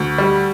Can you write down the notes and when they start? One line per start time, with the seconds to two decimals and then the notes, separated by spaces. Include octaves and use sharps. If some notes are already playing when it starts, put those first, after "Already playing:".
Already playing: D2
0.18 G3